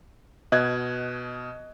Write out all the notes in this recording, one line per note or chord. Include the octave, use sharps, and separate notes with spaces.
B2 D#5 F#6 G#6